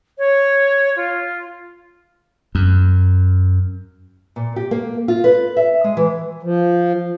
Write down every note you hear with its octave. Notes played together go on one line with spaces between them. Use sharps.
C#5
F4
F#2
A#2
G4
A#3
F4
B4
E5
G#3
E3
F3